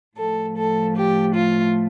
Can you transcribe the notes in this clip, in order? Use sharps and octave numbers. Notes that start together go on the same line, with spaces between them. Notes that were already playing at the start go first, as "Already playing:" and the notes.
A2 F3 A3 A4
A4
G4
F4